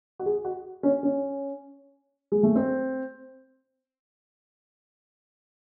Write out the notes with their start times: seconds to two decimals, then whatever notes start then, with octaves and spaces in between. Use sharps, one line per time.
0.19 F#4
0.26 G#4
0.45 F#4
0.83 C#4
1.03 C#4
2.32 G#3
2.43 A3
2.55 C4